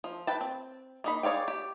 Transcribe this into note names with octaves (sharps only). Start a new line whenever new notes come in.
F3
B4 G5 A5
C4
A#3 D#4 B5
G#4 C#5 D5 F5 G5
G4